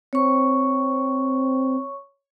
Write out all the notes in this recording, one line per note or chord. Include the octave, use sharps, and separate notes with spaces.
C4 C#5 C#6